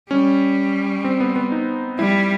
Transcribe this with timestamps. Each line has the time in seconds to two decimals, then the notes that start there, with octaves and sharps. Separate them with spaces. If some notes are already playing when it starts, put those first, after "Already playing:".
0.11 G3 C#4
1.04 C4
1.20 B3
1.36 B3
1.52 D#4
1.99 G3 E4